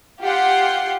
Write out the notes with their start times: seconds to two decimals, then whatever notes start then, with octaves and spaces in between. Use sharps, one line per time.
0.21 F4 G4 F#5 G5 C6